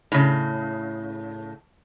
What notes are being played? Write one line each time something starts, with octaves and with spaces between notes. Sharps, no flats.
A2 C#3